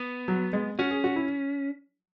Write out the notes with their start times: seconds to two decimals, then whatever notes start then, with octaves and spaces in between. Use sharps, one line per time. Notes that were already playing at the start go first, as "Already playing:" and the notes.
Already playing: B3
0.28 F#3
0.53 G#3
0.79 C#4 F#4
0.91 G#4
1.04 F#4
1.16 E4